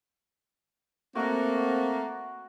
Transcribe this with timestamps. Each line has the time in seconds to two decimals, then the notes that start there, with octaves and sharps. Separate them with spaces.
1.15 A3 A#3 C4 F#4 F#5